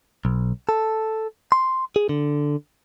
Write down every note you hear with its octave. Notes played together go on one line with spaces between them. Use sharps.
B1
A4
C6
G#4
D3